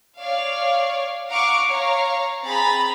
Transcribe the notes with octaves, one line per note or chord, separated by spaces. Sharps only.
C#5 D5 F5
F5 F#5 A#5 C#6 D6 D7
C#5 F5 A#5
C4 G#4 A#5 B5 A6